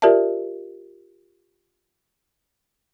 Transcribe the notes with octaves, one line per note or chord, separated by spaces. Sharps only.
F4 G4 A#4 D5 E5 A5